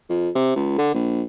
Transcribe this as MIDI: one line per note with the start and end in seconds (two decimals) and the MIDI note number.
0.10 0.29 41
0.35 0.53 48
0.56 0.75 37
0.78 0.91 50
0.94 1.22 34